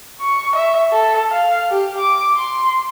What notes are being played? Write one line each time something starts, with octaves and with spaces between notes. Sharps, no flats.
C#6
E5
A4
F5
G4
D6
C6